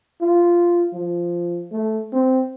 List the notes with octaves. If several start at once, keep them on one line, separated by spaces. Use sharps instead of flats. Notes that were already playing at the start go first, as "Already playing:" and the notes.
F4
F3
A3
C4